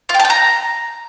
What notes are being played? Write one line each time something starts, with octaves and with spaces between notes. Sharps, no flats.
F4
G5
A5
G5
A#5